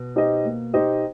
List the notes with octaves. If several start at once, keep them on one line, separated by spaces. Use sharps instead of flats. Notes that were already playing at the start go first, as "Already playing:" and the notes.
Already playing: B2
D#4 G4 C5 D#5
A#3
D#4 G4 C5 D#5